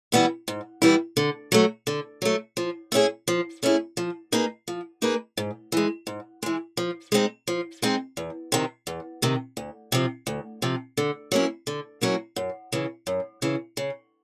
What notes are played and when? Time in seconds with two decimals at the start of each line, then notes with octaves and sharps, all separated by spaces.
0.12 E3 G3 B3 E4
0.48 G#2
0.82 E3 G3 B3 E4
1.17 D3
1.52 F#3 A3
1.87 D3
2.22 F#3 A3
2.57 F3
2.92 A3 C#4 E4 G#4
3.28 F3
3.63 A3 C#4 E4 G#4
3.97 F3
4.32 A#3 D#4 G#4 B4
4.68 F3
5.02 A#3 D#4 G#4 B4
5.37 G#2
5.72 E3 G#3
6.07 G#2
6.43 E3 G#3
6.77 F3
7.12 G#3 C4 D#4
7.48 F3
7.82 G#3 C4 D#4
8.17 E2
8.52 C3 D#3
8.87 E2
9.22 C3 D#3
9.57 D2
9.92 C3 F3
10.27 D2
10.62 C3 F3
10.97 D3
11.32 F#3 A#3 C#4 E4
11.67 D3
12.01 F#3 A#3 C#4 E4
12.36 F#2
12.72 C#3 E3
13.07 F#2
13.42 C#3 E3
13.77 C#3